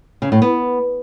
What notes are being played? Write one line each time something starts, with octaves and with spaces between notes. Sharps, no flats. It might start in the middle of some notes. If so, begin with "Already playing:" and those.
C#3
A2
B3